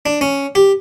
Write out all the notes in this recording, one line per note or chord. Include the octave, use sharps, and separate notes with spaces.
D4
C#4
G4